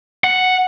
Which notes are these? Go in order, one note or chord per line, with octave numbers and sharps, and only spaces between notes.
F#5